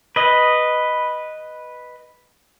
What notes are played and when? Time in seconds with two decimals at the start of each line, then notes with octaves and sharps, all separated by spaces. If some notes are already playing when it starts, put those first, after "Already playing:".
0.16 B4 D#5